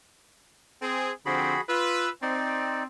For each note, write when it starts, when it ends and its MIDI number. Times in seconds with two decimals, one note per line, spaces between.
0.82 1.11 60
0.82 1.11 68
1.26 1.57 50
1.26 1.57 53
1.26 1.57 60
1.26 1.61 66
1.26 1.61 68
1.26 1.61 83
1.69 2.09 65
1.69 2.09 71
1.69 2.10 88
2.22 2.87 60
2.22 2.83 63
2.22 2.83 74